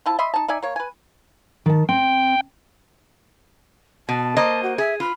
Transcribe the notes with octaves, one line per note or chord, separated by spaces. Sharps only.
F3 E4 A5
D#5 E5 B5 C6
D#4 A5
D#4 D5 E5 G#5
A#3 C#5
B4 G#5
D#3 A5
C4 G5
B2 A5
A#3 C5 D#5
F#4
G#4 E5
F4 B5